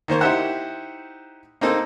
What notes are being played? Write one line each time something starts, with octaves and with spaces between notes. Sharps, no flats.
D#3 A#3 C5 C#6
D#4 E4 G4 C5 E5 F#5
A#3 C4 D#4 A4